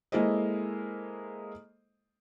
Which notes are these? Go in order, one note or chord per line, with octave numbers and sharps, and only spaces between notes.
G#3 A#3 E4 A4 C5 D#5